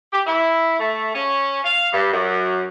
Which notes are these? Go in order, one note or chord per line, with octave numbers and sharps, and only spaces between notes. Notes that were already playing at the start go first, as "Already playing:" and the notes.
G4
E4
A3
C#4
F5
G2
F#2